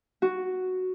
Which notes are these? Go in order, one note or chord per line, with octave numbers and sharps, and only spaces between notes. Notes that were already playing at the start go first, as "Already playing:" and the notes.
F#4